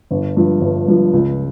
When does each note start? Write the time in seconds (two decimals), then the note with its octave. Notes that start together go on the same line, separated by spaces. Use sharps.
0.11 G1
0.37 G2 F3
0.61 G1
0.88 G2 F3
1.13 C#2